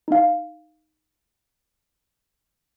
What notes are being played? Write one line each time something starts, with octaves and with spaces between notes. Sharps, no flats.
D#4 F5